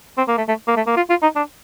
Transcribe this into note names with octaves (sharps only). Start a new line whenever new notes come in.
C4
A#3
A3
A3
A#3
A3
A#3
F4
F4
D#4
D4